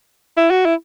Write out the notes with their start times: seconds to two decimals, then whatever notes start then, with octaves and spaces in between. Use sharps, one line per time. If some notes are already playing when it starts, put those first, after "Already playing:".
0.37 E4
0.51 F#4
0.65 E4